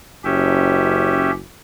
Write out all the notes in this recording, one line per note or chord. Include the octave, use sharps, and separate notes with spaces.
F#1 C#4 G4 E5